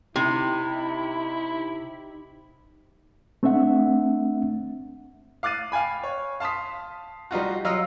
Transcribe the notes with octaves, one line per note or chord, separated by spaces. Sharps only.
C3 D#4 E4 G4
A3 C4 D4 E5 F#5
F5 D6 F#6 A6 D#7
F5 G5 G#5 B5
C#5
F5 A5 C6 D#6 B6
G3 D#4 F4 F#4
F#3 F4 D#5 F5 A#5 E6